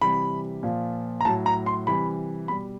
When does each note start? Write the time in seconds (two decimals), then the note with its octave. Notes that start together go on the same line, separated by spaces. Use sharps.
0.01 C3 E3 G3 B5
0.63 A#2 F3
1.21 A#5
1.25 A2 F#3 A5
1.46 A#5
1.66 C6
1.87 C3 E3 G3 B5
2.48 B2 G3 B5